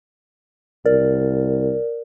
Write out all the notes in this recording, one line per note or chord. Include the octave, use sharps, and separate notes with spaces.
C2 A#4 D5